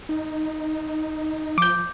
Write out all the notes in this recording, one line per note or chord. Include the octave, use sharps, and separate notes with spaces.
D#4
F3 D6 G6